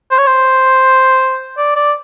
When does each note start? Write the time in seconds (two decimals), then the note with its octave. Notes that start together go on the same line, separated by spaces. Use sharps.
0.11 C5
0.18 C#5
0.27 C5
1.57 D5
1.76 D5